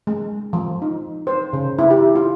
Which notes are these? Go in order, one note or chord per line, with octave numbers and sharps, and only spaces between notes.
G#3
F3
D#4
C5
C#3
E4
G4
F4